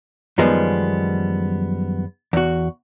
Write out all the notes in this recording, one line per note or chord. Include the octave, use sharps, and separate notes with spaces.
F#2 D#3 F3 G3 G#3 B3
E2 F#4